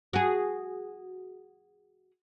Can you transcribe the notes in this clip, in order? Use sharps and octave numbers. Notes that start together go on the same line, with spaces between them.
F#4 G#4